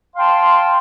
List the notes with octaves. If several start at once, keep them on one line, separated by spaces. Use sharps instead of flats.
F5 G5 A5 C6